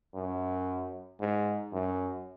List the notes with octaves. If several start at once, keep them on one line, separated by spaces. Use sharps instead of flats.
F#2
G#2
F#2